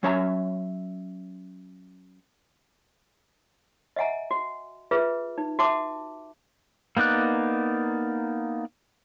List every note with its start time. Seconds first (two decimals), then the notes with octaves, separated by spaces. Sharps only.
0.03 F#3 C#4 C#5 E5 A5 A#5
3.96 D#5 E5 F#5 G#5 A#5
4.31 F#4
4.91 F4 G#4 B4 E5
5.38 D#4
5.59 F#4 E5 A5 D6
6.97 A#3 B3 D#4 D5 F#6